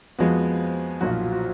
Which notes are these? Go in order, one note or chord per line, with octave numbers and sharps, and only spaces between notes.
F2 F3 G#3 B3 F#4
B1 A#2 F3 F#4
F4
F#4
F#4